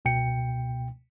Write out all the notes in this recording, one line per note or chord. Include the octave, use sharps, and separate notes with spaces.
C#2 B2 G5 C#7